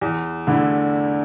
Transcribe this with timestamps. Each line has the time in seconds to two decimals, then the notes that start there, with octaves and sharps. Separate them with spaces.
0.01 E2
0.47 D3 A3 E4